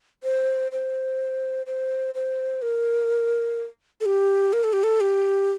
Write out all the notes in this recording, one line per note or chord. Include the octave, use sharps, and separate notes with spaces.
C5
C5
C5
C5
A#4
A4
G4
A#4
A4
G4
A4
G4